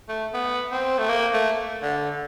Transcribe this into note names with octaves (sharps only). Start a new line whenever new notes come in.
A3
B3
C4
A3
A#3
A3
D3